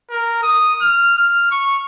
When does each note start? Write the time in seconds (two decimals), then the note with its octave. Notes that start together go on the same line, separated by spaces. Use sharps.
0.10 A#4
0.43 D#6
0.82 F6
1.18 F6
1.51 C#6